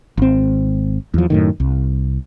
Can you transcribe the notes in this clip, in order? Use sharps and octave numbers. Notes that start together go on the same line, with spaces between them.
G#1 C4
E2 F3
F#2 A2 D#3
C2